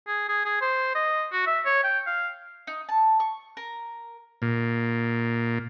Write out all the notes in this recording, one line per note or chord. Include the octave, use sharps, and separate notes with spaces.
G#4
G#4
G#4
C5
D#5
F#4
E5
C#5
G5
F5
D#4
A5
C#6
A#4
A#2